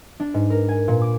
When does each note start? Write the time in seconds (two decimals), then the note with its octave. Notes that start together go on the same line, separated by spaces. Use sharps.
0.20 D4
0.34 G#2
0.50 A#4
0.68 G#5
0.88 A#2
1.01 D6